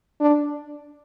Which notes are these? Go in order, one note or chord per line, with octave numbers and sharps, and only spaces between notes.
D4